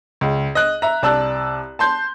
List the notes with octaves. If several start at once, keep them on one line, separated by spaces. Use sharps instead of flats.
C#2
D#5 F#6
E5 A#5
C2 D5 A5 E6 F#6
A5 C6 G6